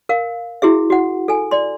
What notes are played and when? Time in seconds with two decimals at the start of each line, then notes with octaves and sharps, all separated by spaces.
0.09 A#4 F5
0.62 E4 F#4 G#4 E5
0.90 F#4 F#5
1.28 A4 G#5
1.51 D5 C6